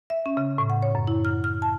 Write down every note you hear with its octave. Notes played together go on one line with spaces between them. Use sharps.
E5
C#4
C#3
A2
F#5
C#5
F#2
E4
F6
F6
A5